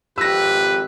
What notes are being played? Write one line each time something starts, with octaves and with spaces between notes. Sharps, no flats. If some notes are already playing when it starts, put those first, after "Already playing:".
G#1 F2 G4 B4 E6 A#6